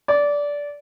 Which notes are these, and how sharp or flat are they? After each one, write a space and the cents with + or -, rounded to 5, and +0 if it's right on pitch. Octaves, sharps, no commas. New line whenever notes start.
D5 -15